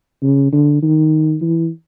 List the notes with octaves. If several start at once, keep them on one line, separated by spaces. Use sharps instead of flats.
C#3
D3
D#3
E3